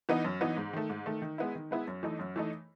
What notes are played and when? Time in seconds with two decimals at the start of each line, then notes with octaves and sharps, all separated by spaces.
0.09 E3 B3 D#4
0.25 F#2
0.41 E3 B3 D#4
0.57 G#2
0.73 D#3 A3
0.90 G#2
1.06 D#3 A3
1.22 D#3
1.38 G#3 B3 E4
1.55 D#3
1.71 G#3 B3 E4
1.87 F#2
2.03 E3 A3 D#4
2.19 F#2
2.36 E3 A3 D#4